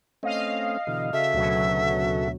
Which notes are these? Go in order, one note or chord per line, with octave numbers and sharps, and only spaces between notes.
A3 C4 C#4 D#5 F5
B2 D3 E3
C#3 F#4 A4 E5
D2 B2 F#3